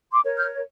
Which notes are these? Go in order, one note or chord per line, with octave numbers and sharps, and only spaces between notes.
C6 D6
A#4 C#5
F6 G6